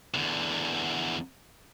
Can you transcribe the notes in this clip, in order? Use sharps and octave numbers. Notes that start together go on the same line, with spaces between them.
E2 D3